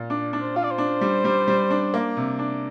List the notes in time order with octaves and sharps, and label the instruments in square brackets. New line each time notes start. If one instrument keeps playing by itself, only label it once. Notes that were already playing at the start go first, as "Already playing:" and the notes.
Already playing: [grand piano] A#2
D4
D4
[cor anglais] C5
[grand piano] F4 [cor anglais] F5
[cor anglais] D5
C5
[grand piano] D4
G3
G3
G3
D4
A#3
C3
D4